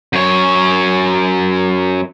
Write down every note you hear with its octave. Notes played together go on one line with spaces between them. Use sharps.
F#2 C#5